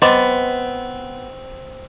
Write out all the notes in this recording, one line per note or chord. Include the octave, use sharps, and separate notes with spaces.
B3 C4 D#5 C6 D6